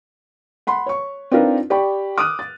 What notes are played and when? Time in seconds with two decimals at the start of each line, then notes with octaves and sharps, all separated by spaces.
0.67 F#5 B5 C6
0.86 C#5 C#6
1.32 C4 D4 D#4 F4 A#4 B4
1.70 G4 D5 G5 B5 C#6
2.18 D6 D#6 F6 F#6 D#7
2.39 A6